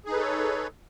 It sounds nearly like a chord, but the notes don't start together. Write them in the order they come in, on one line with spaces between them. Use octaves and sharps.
G#4 D#4 B4 A4 C#5